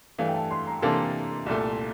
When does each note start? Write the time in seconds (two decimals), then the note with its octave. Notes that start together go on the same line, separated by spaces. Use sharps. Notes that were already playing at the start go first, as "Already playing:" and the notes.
0.18 G2 E3 A3 F5
0.27 G5
0.34 A5
0.51 C6
0.67 A#5
0.82 C3 E3 A#3 D4 A4 A5
1.46 C2 A#2 A3